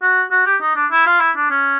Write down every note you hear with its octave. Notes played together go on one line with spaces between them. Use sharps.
F#4
F#4
G4
D#4
D4
E4
F4
E4
D4
C#4